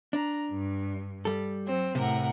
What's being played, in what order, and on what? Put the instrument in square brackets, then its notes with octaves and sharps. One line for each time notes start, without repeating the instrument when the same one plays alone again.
[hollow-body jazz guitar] D4 [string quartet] A#5
[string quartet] G2
[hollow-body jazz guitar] G3 A4
[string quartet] F#3 C4
[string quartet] A2 A#4 F#5 [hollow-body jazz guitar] C3